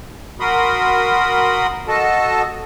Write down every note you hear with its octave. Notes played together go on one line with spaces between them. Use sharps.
F#4 A#4 B5 C6 D#6
F#4 A4 D#5 A5